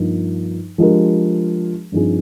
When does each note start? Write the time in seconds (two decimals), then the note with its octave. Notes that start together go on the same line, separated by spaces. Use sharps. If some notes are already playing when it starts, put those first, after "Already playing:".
Already playing: G2 F3 A#3 D#4
0.78 F3 G#3 D4 G4 A#4
1.92 G2 F3 C4 D#4 G#4